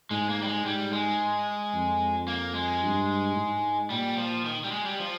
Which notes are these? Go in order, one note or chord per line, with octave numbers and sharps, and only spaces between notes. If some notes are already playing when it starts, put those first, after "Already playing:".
G#2 G#3
A#3
G3
G#3
G#2 G3
G#3
F2
A#3
G#3
G2
G#2
A#2 G3
F3
D#3
G3
G#3
G3
F3